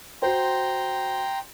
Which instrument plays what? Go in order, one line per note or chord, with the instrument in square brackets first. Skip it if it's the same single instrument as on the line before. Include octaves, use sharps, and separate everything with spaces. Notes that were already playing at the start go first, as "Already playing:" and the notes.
[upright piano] F#4 C5 [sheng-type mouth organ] G5 A#5 C6